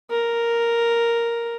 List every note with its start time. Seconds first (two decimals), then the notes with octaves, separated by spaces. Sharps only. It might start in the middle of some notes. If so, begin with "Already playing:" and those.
0.11 A#4